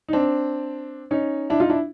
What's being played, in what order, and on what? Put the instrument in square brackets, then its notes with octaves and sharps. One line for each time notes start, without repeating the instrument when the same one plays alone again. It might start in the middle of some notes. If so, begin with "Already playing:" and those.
[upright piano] D#4
C4 D4
C#4 D#4
D4 E4
D#4 F4
D4 E4